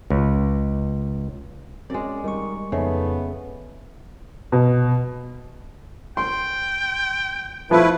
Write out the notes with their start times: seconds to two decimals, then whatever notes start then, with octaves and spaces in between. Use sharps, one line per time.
0.10 C#2
1.90 F#2 G#3 C4 C#4 C#5 D5
2.24 D#3 G3 C#6
2.72 F2 C#3 A3 B3 D#4 D#5
4.52 B2
6.17 G5 C6
7.71 F3 A3 E4 B4